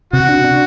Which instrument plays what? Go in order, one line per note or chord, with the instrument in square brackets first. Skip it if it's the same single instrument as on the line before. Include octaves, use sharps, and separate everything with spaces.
[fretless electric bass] C3 [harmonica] F#4
[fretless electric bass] D4
D4